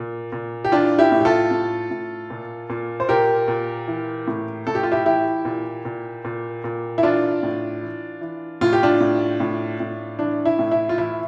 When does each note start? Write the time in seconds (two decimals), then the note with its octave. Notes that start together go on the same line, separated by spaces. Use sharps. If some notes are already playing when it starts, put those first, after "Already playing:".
Already playing: A#2
0.32 A#2
0.65 G4
0.72 E3 D4 F4
0.98 E4 G4
1.12 A2
1.20 G4
1.25 F4 A4
1.51 A2
1.91 A2
2.30 A#2
2.70 A#2
3.00 C5
3.09 A#2 G4 A#4
3.48 A#2
3.88 E3
4.27 A2
4.67 A2 A4
4.75 G4
4.83 F4
4.92 E4 G4
5.06 E3 E4 G4
5.45 A#2
5.85 A#2
6.25 A#2
6.64 A#2
6.98 E4
7.03 E3 D4 F4
7.43 A2
7.82 E3
8.21 E3
8.61 A2 F4
8.73 G4
8.83 D4 F4
9.00 A2
9.40 A2
9.80 A2
10.19 E3 D4
10.45 E4
10.59 A2
10.72 E4
10.89 F4
10.98 E3 E4